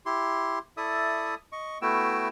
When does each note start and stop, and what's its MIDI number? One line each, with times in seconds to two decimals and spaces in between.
0.06 0.59 64
0.06 0.59 67
0.06 0.59 84
0.77 1.35 64
0.77 1.35 69
0.77 1.35 74
0.77 1.35 76
0.77 1.35 87
1.52 1.78 75
1.52 1.78 85
1.82 2.28 57
1.82 2.28 59
1.82 2.28 64
1.82 2.28 66
1.82 2.28 79
1.82 2.28 88